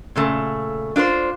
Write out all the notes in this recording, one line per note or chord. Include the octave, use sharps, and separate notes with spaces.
A#2 C#3 A3
D4 F4 B4 C5